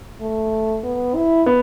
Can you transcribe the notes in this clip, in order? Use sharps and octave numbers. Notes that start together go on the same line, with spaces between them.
A3
B3
E4
B3